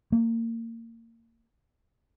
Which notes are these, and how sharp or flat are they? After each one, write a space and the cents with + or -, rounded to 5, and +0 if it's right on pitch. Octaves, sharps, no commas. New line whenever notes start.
A#3 -30